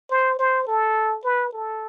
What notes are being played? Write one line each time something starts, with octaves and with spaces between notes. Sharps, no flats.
C5
C5
A4
B4
A4